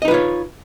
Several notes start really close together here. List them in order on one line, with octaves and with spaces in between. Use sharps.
D#5 D#4 B4 F4 C#5